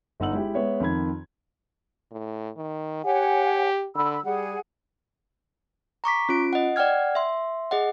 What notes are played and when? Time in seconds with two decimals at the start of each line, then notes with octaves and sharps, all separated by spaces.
0.20 G1 D#4 F#5 E6 F#7
0.33 G#3 E4 G4
0.54 G#3 B3 C#5 E5
0.80 F2 D#3 B5 G#6
2.11 A2
2.57 D#3
3.05 G4 C#5 F#5 G#5
3.95 D3 B5 E6
4.24 G3 G#4 F#5
6.04 A#5 C#6 D6 B6
6.29 C#4 F4 D7
6.53 D#5 F#5
6.76 D5 F#5 G5 F6 G#6
7.15 E5 C6
7.71 G#4 D#5 F#5